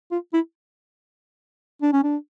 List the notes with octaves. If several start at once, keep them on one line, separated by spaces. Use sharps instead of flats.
F4
E4
D4
C#4
D4